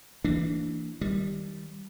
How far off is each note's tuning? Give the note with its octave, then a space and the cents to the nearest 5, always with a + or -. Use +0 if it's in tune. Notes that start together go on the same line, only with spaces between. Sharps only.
E3 +0 A#3 -25 D4 +0
D#3 +30 G3 +0